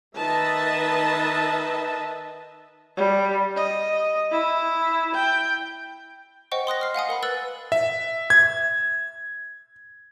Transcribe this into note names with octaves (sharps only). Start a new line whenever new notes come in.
D#3 B4 D#5 E5 A5
G3
D#5
E4
G5
C5 D#5 F#5 G5 C#6
C6 D#6 F#6 A#6
F6 C7
F5 F#5 G#5 D#6
A#4 F#5 B5
B4 E6 F#6 A6 F#7
E5
G#6